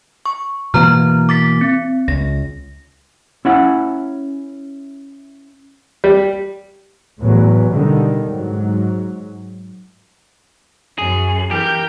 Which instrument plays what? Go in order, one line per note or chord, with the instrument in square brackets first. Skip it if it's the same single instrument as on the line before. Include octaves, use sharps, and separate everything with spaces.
[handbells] C#6
[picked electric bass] B2 E3 A#3 [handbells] A#5 F6
[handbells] D6 A6 B6
C4
[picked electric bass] C#2 [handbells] A#6
[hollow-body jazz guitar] C#4 E4 F#5
[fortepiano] G3
[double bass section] E2 A2 E3 F#3
B2 D3 D#3 G3
G#2 F#3
[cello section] F#2 [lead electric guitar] G#4
[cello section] E3 [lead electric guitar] G4 [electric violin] A#4 G6